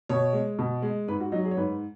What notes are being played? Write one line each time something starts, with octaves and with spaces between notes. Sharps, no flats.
B2 C#5
G#3
B2
G#3
G#2 B4
F#4
F#3 D#4
G#4
C#5
G#2 B4